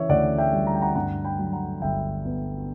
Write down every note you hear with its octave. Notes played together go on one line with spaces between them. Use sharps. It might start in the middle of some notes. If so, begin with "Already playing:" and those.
Already playing: C#3 E3 C#5 E5
D2 D5 F#5
E5 G5
G3
A#5
G5
F#5 A#5
G2 F#5 A#5
G5 B5
F#3
F#5 A#5
G1 E5 G5
B3